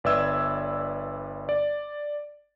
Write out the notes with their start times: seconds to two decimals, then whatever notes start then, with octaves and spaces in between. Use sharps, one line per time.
0.04 G1 B4 D5 E5 E6 G#6
1.49 D5